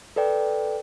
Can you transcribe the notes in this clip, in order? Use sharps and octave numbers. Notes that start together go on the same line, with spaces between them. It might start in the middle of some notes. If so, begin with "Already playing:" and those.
A4 B4 D5 G5